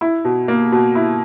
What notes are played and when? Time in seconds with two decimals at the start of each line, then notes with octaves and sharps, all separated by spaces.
0.01 E4
0.24 B2
0.48 A#3
0.72 B2
0.95 E4